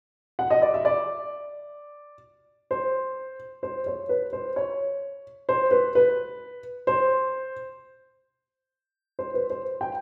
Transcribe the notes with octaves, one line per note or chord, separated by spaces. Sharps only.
F#5
D#5
D5
E5
D5
C5
C5
C#5
B4
C5
C#5
C5
B4
B4
C5
C5
B4
C5
G5